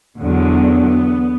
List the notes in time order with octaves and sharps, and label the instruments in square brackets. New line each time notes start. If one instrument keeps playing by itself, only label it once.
[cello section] E2 D3 F#3 B3